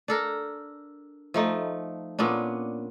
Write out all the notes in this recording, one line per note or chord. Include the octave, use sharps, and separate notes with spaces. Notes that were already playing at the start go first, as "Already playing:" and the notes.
D4 A4 A#4
F3 A3 D#4
A#2 B3 C#4 D4